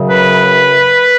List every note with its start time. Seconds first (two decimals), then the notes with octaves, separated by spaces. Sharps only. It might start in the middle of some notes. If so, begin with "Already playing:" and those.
Already playing: F#2 C#3 F#3
0.09 B4